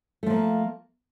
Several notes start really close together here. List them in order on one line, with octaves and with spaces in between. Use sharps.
A3 F3 A#3